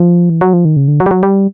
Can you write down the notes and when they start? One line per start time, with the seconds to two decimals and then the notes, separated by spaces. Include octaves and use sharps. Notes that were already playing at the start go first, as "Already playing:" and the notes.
Already playing: F3
0.30 E3
0.41 F#3
0.53 F3
0.65 D#3
0.76 C#3
0.88 D3
1.00 F#3
1.06 G3
1.11 F#3
1.23 G3